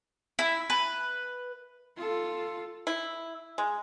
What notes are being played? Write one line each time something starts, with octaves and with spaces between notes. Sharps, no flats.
E4
B4
F4 A4
E4
G#3